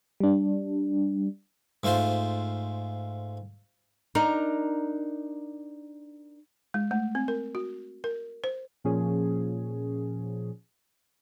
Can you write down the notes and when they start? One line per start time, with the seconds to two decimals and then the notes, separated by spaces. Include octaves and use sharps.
0.20 G3 D4
1.83 G#2 A3 F4 C5 C6
4.15 D4 D#4 A#4
6.74 G#3
6.91 A3
7.15 C4
7.28 A#4
7.55 F#4
8.04 A#4
8.44 C5
8.84 A#2 F3 C#4 G#4